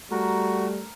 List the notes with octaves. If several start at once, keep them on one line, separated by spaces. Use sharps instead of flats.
G3 A3 F#4 A#4